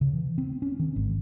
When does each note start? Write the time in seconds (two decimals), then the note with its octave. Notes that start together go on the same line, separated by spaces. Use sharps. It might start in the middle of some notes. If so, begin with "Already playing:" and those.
0.01 C#3
0.13 E3
0.38 C4
0.62 C#4
0.79 D#3
0.96 G#1